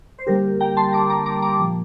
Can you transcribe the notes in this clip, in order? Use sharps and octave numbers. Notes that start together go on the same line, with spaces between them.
C5
D3 G3 A#3 G4 A#4
G5 A#5
A5 C6
A#5 D6
A#5 D6
A#5 D6
A#5 D6
A#2 F3 A#3